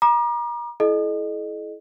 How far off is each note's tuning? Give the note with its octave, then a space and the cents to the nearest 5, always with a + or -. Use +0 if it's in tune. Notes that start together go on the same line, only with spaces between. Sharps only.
A#5 +35 D6 +40
E4 +0 A4 -45 D#5 -25